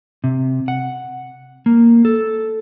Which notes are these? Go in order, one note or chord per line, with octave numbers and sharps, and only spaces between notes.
C3
F#5
A#3
A4